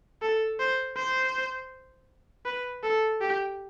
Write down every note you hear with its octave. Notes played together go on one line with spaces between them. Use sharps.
A4
C5
C5
B4
A4
G4